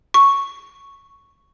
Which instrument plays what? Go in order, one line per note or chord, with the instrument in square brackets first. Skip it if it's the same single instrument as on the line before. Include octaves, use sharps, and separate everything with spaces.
[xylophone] C#6